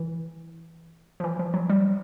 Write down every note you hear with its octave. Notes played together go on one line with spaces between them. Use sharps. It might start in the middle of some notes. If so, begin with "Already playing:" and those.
Already playing: E3
F3
E3
F3
F#3
G3